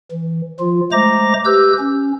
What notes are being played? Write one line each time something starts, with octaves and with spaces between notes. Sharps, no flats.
E3
F3 F4
G#3 A3 C5 A#5 D6 A#6
G4 B4 E6 G6
C#4